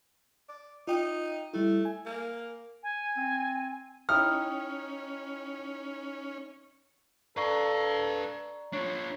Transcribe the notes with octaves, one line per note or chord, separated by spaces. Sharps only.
D5
D#4 F4 G5
G3 A3 E4
G#5
A#3
G#5
C4
C#4 D#4 E4 G5 D#6 F6
A4 B4 D5 F5 A#5 C#6
D4 F4 C#5